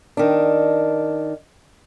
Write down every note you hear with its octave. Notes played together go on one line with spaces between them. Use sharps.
D#3 D4